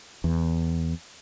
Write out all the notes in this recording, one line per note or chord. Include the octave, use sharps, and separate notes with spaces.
E2